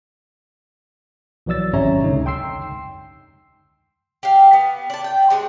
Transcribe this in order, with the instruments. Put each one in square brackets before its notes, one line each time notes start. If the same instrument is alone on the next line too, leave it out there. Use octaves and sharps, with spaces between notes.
[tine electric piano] B1 E3 F#3 D5 E6 A6
G#1 C3 C#4 C#5 E5 A#5
C#2 D3 D#4
G5 C6 E6 C7
[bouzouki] G4 F5
B3
D5 A5
G5
C3 G#3 D4